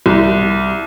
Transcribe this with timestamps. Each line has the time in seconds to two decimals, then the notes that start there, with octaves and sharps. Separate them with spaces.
0.06 C2